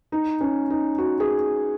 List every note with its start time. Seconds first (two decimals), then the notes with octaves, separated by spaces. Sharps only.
0.12 D#4
0.41 C#4
0.70 D#4
0.98 F#4
1.20 G#4